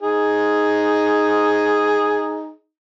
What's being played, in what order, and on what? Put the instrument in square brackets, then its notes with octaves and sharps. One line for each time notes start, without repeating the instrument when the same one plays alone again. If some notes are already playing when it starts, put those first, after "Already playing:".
[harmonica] D#4 G#4